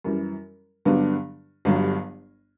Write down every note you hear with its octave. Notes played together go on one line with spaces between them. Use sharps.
F#2 E3 G3
G2 D3 F#3 B3 D4
G1 G2 F#3